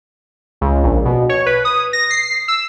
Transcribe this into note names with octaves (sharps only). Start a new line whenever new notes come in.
C#2
A#1
B2
C#5
B4
D#6
A#6
C7
E6